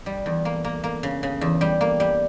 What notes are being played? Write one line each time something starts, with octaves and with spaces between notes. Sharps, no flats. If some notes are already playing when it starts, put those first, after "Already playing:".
G3
E2
A#3
A#3
A#3
C#3
C#3
E2
G3
A#3
G3